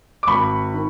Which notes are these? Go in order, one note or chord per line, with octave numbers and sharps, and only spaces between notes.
D6
G#1 B5 C#6
D#3